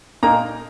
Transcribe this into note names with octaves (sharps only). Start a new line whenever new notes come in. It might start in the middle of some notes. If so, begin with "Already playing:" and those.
A#2 A#3 D#4 A#5